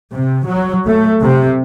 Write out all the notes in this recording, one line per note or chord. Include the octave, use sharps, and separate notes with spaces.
C3
F#3
A3
C3